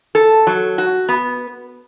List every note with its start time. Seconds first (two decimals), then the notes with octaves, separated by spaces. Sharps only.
0.15 A4
0.47 F#3
0.78 F#4
1.09 B3